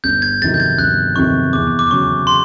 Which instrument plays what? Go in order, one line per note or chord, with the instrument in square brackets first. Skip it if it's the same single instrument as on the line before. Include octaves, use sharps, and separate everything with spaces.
[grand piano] G1 [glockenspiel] G6
[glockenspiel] G#6
[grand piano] F2 C3 D#3 F#3 [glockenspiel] A6
[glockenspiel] G6
G#6
[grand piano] G1 [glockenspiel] F#6
[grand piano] F2 C3 D#3 F#3 [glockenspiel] C#6
[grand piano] E2 [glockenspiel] D6
[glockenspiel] D6
[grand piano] C#3 F#3 [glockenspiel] C#6
[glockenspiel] C6